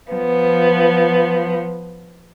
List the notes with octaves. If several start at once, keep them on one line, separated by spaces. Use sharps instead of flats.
F3 B3